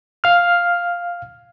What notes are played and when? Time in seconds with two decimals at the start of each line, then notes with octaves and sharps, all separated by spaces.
0.24 F5 F6